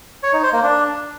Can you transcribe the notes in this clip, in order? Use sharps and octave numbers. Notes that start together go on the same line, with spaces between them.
C#5
D#4
C5
A#3
D4